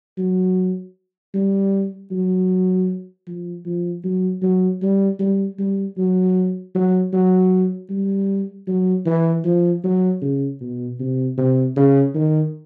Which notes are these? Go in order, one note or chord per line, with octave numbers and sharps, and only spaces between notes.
F#3
G3
F#3
F3
F3
F#3
F#3
G3
G3
G3
F#3
F#3
F#3
G3
F#3
E3
F3
F#3
C#3
B2
C3
C3
C#3
D#3